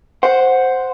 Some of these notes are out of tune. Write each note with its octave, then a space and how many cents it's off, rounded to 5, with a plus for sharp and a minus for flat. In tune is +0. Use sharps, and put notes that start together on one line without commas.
C5 +0 F#5 -5